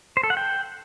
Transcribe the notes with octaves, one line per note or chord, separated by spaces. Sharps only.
C5
A4
F#5
G5